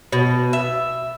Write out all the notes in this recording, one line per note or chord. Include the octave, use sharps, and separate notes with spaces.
B2
E5